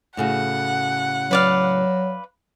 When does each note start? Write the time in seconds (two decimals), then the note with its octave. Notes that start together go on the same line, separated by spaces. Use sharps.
0.17 A2 C#3 F#4 F#5
1.31 F#3 B4 D5 F5